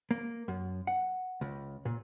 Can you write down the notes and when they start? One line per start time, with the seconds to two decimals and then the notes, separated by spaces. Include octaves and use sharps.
0.11 A#3
0.48 F#2
0.87 F#5
1.41 C#2
1.85 A#2